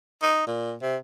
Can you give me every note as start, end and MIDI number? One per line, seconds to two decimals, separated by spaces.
0.23 0.43 63
0.47 0.74 46
0.82 0.97 48